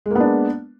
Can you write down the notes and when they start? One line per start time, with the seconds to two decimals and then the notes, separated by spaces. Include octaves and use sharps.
0.06 G#3
0.10 A#3
0.15 B3
0.20 D4